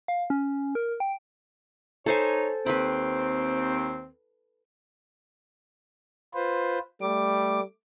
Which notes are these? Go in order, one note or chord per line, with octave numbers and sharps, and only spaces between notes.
F5
C#4
A#4
G5
D#4 A4 C5 C#5 G#5
D#2 C4 B4 G5 B5
F4 B4 C5
G3 A3 D6